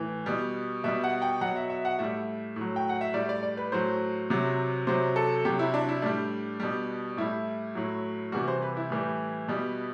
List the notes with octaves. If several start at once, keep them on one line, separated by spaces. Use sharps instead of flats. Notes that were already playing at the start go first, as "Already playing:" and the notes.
Already playing: A2 E3
B2 G3
B2 G3 E5
F#5
G5
B2 F#3 F#5
E5
E5
F#5
A2 G3 E5
A2 F#3
G5
F#5
E5
A2 G3 D5
D5
D5
B4
A2 F#3 C5
C3 F#3
C3 F#3 C5
A4
C3 F#3 G4
E4
D4
E4
A2 G3 D4
B2 G3
A2 G3 E4
A2 F#3
C3 E3 G3 F#4
C5
B4
E4
A2 E3 G3
B2 G3